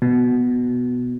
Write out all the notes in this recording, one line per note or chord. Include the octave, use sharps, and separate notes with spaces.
B2